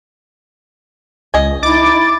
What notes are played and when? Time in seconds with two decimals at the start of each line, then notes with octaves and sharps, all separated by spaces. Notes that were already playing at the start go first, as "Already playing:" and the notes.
1.34 C#2 D#5 G#5
1.63 D#4 E4 D6 A6